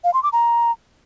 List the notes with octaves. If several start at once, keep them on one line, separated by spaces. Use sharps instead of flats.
F5
C6
D6
A#5